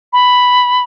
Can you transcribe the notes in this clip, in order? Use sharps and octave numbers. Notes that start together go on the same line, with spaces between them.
B5